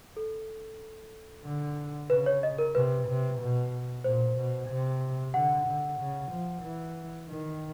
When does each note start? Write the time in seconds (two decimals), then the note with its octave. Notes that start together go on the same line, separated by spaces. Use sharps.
0.17 A4
1.45 D3
2.10 C#3 B4
2.26 C#5
2.43 D#5
2.58 A#4
2.75 C3 B4
3.07 C3
3.41 B2
4.04 A#2 C5
4.37 B2
4.69 C3
5.34 D3 F#5
5.66 D3
6.00 C#3
6.32 F3
6.63 E3
7.29 D#3